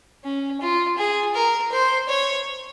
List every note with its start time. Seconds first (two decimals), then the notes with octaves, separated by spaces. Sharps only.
0.25 C#4
0.61 F4
0.98 G#4
1.35 A#4
1.72 C5
2.09 C#5